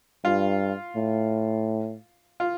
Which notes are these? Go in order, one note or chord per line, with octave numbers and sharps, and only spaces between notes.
G2 F4
A2
F4